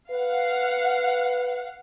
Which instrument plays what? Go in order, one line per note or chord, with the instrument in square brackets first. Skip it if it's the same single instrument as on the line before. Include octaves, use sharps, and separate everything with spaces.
[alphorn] B4 [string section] F5 F#5